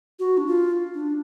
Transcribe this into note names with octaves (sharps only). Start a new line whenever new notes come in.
F#4
D4
F4
D4